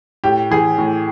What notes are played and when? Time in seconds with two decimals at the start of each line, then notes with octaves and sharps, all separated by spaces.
0.24 A2 G4
0.51 E3 G#4
0.78 A2